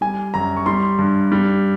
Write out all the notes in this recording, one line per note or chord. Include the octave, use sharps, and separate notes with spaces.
G3 G#5
F#2 A#5
C#6
G3 C6
G2
G3